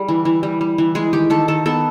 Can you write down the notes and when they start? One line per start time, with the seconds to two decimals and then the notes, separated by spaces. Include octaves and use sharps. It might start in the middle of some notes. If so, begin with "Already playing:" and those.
Already playing: G3 G#4
0.08 E3
0.25 E3
0.43 G3
0.61 G3
0.78 E3
0.95 G#3 G#4
1.13 D#3 G4
1.30 D#3 A4
1.48 D#3 A4
1.66 B3 A4